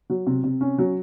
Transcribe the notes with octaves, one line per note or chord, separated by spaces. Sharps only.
F#3
C3
C3
C#4
F#3